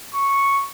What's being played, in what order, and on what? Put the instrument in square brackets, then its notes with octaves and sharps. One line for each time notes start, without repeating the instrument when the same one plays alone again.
[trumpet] C#6